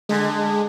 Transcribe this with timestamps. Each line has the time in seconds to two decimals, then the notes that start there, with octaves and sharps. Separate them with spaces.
0.09 D3 G#3